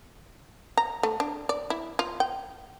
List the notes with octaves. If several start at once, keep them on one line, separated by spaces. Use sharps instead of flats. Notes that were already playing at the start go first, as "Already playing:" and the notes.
A#5
A3
D4
D5
E4
F4
G5